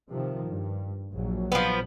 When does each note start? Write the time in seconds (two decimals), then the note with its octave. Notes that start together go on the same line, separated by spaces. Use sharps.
0.11 C3 D#3 F3
0.47 G2
1.12 A#1 F#3
1.52 F3 B3